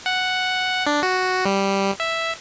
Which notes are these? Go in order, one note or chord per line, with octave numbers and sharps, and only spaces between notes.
F#5
D4
F#4
G3
E5